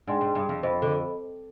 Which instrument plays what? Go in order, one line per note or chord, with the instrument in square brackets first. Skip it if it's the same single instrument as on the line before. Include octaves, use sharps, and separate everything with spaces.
[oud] G#2 [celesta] D4 G#4 D5 G5 C6
[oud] G#2
G2
F2
[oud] F2 [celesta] C5 D#5 B5
[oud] D3